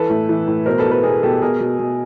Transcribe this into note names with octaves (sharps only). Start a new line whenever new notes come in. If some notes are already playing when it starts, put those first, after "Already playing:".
Already playing: E3 A4 B4
A2
E3
A2
B2 A#4 C5
A4 B4
B2
A4 B4
B2 G#4 A#4
B2 G4 A4
B2 G#4 A#4
B2
B2